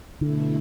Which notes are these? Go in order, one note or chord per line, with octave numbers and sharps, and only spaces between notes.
B2 D3 A3 E4